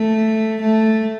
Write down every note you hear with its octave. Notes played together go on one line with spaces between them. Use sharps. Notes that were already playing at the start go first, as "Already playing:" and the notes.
Already playing: A3
A3